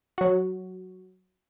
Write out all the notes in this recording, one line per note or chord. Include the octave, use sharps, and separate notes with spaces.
F#3 F#4